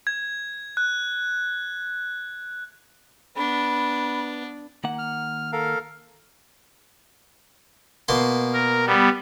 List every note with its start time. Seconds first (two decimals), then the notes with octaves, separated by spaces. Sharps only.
0.07 G#6
0.77 F#6
3.37 B3 D4 B5
4.84 D#3 A#3 F#5
4.99 F6
5.53 A4 A#4 F5
8.08 B2 A#3 C6
8.53 A#4
8.86 G3 B3